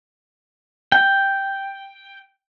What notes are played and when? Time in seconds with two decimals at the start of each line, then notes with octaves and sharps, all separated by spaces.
0.92 G5